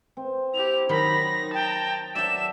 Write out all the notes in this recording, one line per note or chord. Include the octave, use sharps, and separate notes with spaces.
C4
E4 G4 F7
D#3 F#3 D#4 B5 A#6
G5 A5 A#5
F#3 D4 D5 E5 G5 E7